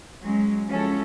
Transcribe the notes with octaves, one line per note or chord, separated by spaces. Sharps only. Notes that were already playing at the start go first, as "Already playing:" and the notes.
F#3 G#3 C#4
F3 G#3 C#4 E4 F#4 A4